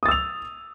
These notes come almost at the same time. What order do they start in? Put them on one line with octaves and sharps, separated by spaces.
D#6 A6 E6 F7